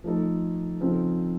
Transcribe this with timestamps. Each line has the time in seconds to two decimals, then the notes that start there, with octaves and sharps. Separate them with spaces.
0.04 F3 A3 D#4 A4
0.80 C#3 F3 C4 D#4 A4